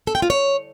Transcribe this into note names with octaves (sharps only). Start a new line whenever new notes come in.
A4
G5
F4
C#5